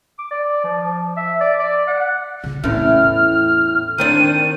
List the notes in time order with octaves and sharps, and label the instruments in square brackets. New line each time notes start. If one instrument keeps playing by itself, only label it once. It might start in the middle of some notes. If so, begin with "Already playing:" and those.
[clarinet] D6
D5
F3
E5
D5
D5
F#5
[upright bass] C#3
[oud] E2 A2 [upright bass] C#4 E4 [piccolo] F6
[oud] D#3 C4 D4 [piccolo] D#7